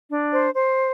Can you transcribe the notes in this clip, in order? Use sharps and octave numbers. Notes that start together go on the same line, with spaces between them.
D4
C5
C5